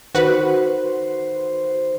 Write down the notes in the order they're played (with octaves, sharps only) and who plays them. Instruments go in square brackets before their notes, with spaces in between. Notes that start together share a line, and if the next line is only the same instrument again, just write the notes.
[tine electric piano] D#3 [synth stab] F#4 B4 [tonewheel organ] C5